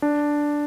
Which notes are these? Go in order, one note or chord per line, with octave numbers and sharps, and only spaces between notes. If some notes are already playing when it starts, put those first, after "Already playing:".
D4